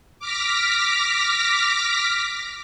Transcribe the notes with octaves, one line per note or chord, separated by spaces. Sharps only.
D6 F6 A#6 B6